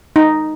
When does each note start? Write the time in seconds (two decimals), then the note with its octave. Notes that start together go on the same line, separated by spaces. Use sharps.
0.16 D#4